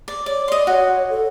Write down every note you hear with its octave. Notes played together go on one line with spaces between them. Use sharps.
D5
C#5 D5
D5 D#5 C6
F#4 C#5
A4